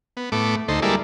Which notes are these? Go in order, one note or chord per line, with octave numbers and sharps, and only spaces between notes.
B3
A2 A3 B3 D6
D2 D#4 A4 C5
G3 G#3 A#3 E4 A4 D5